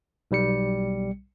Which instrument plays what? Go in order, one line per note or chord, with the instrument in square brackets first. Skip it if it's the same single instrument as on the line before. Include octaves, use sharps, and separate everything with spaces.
[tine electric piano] B1 G3 C#7